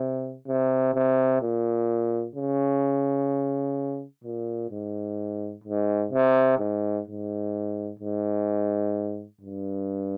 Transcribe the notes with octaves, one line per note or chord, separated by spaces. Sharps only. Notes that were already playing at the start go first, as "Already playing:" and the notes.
Already playing: C3
C3
C3
A#2
C#3
A#2
G#2
G#2
C3
G#2
G#2
G#2
G2